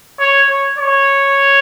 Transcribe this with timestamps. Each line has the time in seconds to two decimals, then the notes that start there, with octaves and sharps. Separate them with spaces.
0.19 C#5
0.48 C#5
0.78 C#5